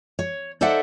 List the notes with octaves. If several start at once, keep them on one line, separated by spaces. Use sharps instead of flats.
C#5
D#4 A4 C5 D5 E5 F#5